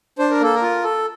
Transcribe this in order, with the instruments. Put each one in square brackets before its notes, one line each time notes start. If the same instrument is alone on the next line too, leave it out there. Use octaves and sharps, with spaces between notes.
[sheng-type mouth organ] D4 C5
A#4
A#3 A4
A#4
F4
A4